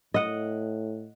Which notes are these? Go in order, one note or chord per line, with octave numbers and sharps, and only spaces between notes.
A2 D#5 F#5